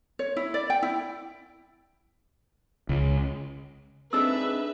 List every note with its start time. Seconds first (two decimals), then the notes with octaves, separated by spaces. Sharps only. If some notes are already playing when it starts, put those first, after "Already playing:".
0.19 C#5
0.36 E4
0.54 D5
0.70 G5
0.83 E4
2.89 C#2
4.13 C4 D4 D#4 G#4 A4 B4 E5 E6